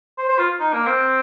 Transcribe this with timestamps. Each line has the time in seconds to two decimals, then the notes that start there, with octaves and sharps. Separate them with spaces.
0.18 C5
0.28 C5
0.38 F4
0.60 D#4
0.73 A#3
0.87 C4